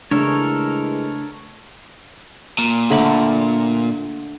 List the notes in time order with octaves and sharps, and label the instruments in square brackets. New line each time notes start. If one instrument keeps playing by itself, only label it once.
[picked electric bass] C#3 A3 [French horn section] E3 G#3 [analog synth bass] D4 [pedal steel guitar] A4 A#4 C#5
[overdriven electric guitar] A#2
[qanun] D3 A3 B5